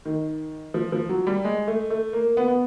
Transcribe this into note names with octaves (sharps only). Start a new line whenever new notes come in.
D#3
F3
F3
F#3
G3
G#3
A3
A3
A#3
B3
B3